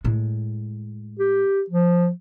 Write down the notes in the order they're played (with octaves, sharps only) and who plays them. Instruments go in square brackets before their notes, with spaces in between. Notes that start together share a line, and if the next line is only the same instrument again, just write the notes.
[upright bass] A2 G#3
[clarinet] G4
F3